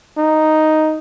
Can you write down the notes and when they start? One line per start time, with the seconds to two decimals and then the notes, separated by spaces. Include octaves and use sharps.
0.17 D#4